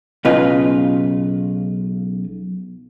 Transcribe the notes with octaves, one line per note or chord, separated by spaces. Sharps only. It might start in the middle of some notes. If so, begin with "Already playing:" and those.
B1 C#3 F4 B4 D#5